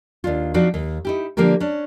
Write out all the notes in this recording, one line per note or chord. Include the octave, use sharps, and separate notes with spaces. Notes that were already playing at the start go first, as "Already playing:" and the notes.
D#2 D4 F4
F3 C4 D4 D#4 F#4 D5
D#2
D#4 E4 G4
D3 F3 A#3 D4 G4 A#4
C#4 D4